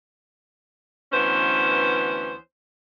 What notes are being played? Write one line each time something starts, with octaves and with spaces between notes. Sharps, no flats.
D2 E3 B3 C#4 C5